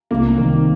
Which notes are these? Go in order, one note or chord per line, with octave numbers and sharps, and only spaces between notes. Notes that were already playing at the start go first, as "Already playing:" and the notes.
C2 A#3
C3 D#3